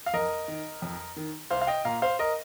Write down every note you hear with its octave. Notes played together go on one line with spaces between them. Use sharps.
F5
F2 A#4 D#5
D#3
F2
D#3
C2 C5 F5
F5
D#5 G5
A#2 F5 A#5
C5 F5
A#4 D#5